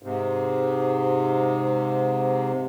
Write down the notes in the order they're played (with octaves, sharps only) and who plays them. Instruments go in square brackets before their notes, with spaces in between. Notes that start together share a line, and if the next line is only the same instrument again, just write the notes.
[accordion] G#2 C3